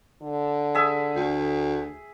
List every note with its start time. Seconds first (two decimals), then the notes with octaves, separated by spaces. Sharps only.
0.22 D3
0.75 G#4 E5
1.16 D2